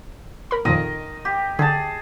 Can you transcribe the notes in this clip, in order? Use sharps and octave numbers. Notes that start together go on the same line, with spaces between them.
A#4 B5
F2 A#2 D#3 D#5
G4
D3 G#4 A5